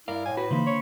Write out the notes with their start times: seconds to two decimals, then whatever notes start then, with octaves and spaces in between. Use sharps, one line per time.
0.08 G2 E4 A#4 D5 F5
0.26 A2 G#5
0.37 F#4 B4
0.50 C#3 E3 A#3 D#4 C5 B5
0.67 D3 C#5